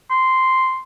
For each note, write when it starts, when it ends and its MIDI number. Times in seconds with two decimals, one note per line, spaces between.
0.11 0.81 84